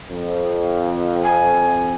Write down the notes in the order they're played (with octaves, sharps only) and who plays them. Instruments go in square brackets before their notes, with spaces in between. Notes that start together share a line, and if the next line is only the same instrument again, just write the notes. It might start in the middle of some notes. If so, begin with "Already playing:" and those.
[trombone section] F2
[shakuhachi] G#5